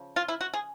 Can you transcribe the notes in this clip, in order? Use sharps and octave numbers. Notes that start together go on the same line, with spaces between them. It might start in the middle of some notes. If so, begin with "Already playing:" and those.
Already playing: C#3 F3
F4
E4
F#4
G#4